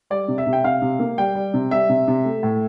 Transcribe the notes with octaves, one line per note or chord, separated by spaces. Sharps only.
G3 D5
C3
E5
C3
G5
C3 F5
C3
A#3
G3 G5
G3
C3
G3 E5
C3
C3
A3
A2